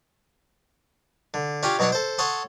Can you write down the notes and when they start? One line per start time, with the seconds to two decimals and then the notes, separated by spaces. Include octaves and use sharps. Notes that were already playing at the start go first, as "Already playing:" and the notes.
1.34 D3
1.63 C#4 D4 F4 G4 F5 G#5
1.79 B2 F#3 D4 C#5 F#5
1.92 A4 C5
2.18 A4 C#5 F#5 C6 D#6